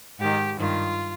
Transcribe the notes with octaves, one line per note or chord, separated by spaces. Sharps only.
G#2 D#3 G4
G2 D#3 F4